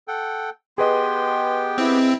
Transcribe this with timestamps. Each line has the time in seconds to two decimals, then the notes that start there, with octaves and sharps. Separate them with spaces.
0.08 A4 F#5 G5
0.78 B3 G4 G#4 B4 D#5 G5 C6
1.78 C4 E4